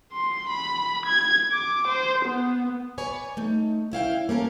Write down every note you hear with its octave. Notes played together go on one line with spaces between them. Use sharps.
C6
B5
G#6
D6
C5
B3
B4 C#5 D5 G#5
A3 D#4
C#4 E4 F5 G5
A#3 C#4 A4 A#4